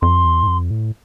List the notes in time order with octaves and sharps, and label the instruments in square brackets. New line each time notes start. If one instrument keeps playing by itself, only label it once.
[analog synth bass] F2 [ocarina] C6
[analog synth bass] E2
G#2
F2
A2